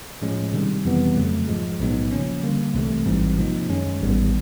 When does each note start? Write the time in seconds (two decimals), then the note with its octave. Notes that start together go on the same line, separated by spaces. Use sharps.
0.22 A2 F3 G#3 C#4
0.53 C3 D#3 G3
0.85 F2 C3 E3 G3 B3
1.17 F2 C#3 F#3 A3
1.48 G#2 F3 G#3
1.80 B1 A2 F#3 B3 D#4
2.12 C#3 F3 A#3 C#4
2.43 D3 G3 A#3
2.74 C2 C3 E3 A3
3.06 A1 G#2 E3 G3 C4
3.38 C3 F3 A#3 D#4
3.69 F#2 D#3 G#3 C#4
4.01 A1 G#2 D#3 G3 B3